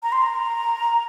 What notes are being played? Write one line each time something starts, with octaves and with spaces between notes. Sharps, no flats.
A#5
C6
A#5